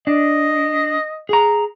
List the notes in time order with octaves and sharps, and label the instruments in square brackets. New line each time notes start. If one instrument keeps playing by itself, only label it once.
[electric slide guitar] D4 [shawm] D#5
[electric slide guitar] G#4 A#5